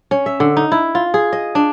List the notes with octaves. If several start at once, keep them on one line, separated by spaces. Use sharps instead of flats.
C#4
E5
D3
D#4
E4
F4
G#4
D#5
D4